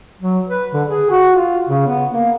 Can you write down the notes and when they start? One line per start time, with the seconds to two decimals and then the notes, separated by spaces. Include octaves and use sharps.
0.21 F#3
0.49 B4
0.73 D3
0.88 G#4
1.10 F#4
1.35 F4
1.69 C#3
1.87 B3
2.10 A#3